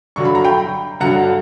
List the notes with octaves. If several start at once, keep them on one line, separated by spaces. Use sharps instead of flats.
G2 D3 F#3 C#6
B5
A#5
G5 B5
G2 D3 F#3 F#5 A#5